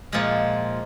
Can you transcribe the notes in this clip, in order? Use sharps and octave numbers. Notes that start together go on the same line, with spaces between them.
A#2 F3 G#3